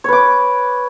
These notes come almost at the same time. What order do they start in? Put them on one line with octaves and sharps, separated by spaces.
C#5 B4 D6